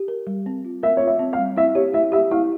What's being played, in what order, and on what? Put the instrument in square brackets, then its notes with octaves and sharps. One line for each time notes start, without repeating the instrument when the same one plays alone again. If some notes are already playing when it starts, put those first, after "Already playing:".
Already playing: [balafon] G4
A#4
G3
C4
F4
[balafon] A#4 [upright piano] E5
[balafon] F4 [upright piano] C#5
[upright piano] E5
[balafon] C4
[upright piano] F5
[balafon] G3
[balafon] E4 [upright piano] E5
[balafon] G4 [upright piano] C#5
[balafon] E4 [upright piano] E5
[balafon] G4 [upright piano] E5
[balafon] E4 [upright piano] F5